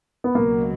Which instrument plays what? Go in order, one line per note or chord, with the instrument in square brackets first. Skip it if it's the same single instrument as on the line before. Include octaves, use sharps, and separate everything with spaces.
[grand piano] B3
[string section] C#2 B2 F#3 [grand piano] A#3